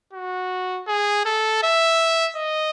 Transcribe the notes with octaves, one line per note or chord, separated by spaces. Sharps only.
F#4
G#4
A4
E5
D#5